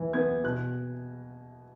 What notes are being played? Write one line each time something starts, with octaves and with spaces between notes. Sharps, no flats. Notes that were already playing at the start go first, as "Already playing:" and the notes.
Already playing: E3
B3 G#6
B2 F#6